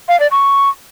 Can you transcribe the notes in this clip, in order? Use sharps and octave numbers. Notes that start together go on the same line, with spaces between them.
F5
D5
C#6